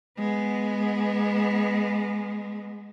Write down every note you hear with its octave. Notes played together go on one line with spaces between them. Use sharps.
G#3 B3